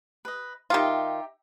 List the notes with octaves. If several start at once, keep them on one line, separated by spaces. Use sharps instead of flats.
B4 D#5
D#3 D#4 F4 G4 E5